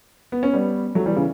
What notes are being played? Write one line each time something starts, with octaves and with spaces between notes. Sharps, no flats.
B3
C#4
G3 B3
F#3 A3
E3 G3
C#3 E3